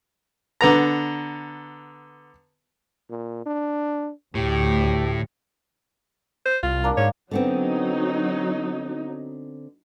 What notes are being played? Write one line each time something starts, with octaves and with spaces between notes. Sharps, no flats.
D3 B3 A#5
A#2
D4
D2 A2 G4
C5
C2 F4
A#3 D4
G#2 C#5
D3 F#3 B3 C4 D#4